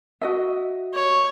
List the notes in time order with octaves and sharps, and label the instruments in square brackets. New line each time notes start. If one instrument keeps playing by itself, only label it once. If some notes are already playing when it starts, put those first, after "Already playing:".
[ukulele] F#4 D#5 E5
[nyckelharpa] C#5